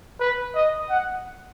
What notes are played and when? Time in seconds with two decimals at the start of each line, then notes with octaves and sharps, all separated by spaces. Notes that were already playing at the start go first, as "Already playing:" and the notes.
0.20 B4
0.55 D#5
0.89 F#5